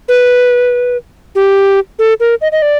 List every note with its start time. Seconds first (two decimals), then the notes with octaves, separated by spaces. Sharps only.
0.09 B4
1.35 G4
1.99 A4
2.20 A#4
2.41 D#5
2.52 D#5
2.62 D5